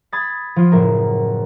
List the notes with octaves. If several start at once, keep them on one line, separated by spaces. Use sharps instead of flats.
B5 D#6 G#6 A6 B6
F3 F4
F#1 A2 A#4